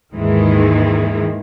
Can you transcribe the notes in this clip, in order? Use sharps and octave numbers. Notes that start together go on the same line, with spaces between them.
D#2 G#2 D#3 E3 G#3